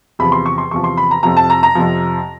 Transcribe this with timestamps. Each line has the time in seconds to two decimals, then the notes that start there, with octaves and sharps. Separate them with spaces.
0.19 E2 C3 F3 B5
0.32 C6
0.46 C#6
0.58 C6
0.71 E2 C3 F3 C#6
0.84 C6
0.97 B5
1.11 A#5
1.23 F2 C3 F3 A#5
1.37 A5
1.50 A#5
1.63 A#5
1.75 F2 C3 F3